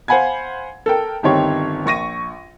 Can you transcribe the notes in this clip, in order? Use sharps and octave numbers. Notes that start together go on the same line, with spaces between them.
C5 F5 F#5 G#5 B5 G#6
A4 A#4 G5
G1 D#3 C4 G4 C#5
A#1 C#6 A#6 D#7